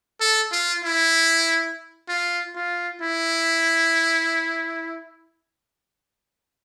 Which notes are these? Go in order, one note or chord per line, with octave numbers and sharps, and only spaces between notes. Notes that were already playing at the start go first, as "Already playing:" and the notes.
A4
F4
E4
F4
F4
E4